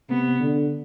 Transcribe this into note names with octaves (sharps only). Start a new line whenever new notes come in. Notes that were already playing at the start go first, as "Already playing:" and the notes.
C3 B3
D3